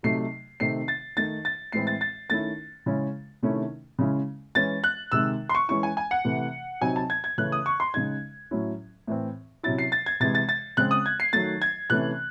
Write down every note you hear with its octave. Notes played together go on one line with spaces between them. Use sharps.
C3 F#3 A3 D#4 C7
C3 D#3 A3 C4 D#4 C7
A6
D#3 A3 D#4 A6
A6
A2 E3 G#3 C4 E4 C7
A6
A6
D#3 A3 C#4 E4 A6
C#3 G#3 C#4 E4
C3 D#3 A3 C#4 E4
C#3 G#3 C#4 E4
E3 G#3 C#4 A6
F#6
C3 D#3 G#3 E6
C6
C#6
E3 G#3 C#4 E4 C#6
G#5
G#5
F#5
C3 E3 A3
C3 F#3 C4 D#4 G#5
A5
G#6
G#6
C#3 E3 A3 C#4 F#6
D#6
C#6
C6
C#3 G#3 D#4 G#6
A2 F#3 C#4 E4
A2 E3 C4
C3 F#3 C#4 E4 A6
C7
A6
G#6
C3 E3 G#3 A6
A6
A6
C#3 G#3 C4 F#6
D#6
G#6
C7
D#3 F#3 A3 A6
G#6
C3 E3 A3 C#4 F#6